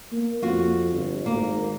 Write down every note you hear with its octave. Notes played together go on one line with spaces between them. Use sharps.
A#3
F2 F4 F#4
G1
G#1 A#3